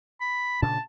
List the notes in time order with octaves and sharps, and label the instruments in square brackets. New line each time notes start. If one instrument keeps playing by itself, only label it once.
[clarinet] B5
[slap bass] A#2 C#3 D4 [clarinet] A5